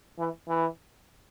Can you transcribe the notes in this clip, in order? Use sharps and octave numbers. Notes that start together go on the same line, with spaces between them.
E3
E3